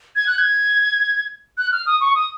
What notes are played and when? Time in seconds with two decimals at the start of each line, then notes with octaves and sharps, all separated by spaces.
0.16 G#6
0.27 F#6
0.38 G#6
1.58 F#6
1.72 F6
1.86 D#6
2.01 C#6
2.15 D#6